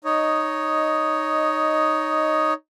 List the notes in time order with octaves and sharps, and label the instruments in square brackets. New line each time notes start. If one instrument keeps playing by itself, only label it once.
[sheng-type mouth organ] D#4 C#5 D#5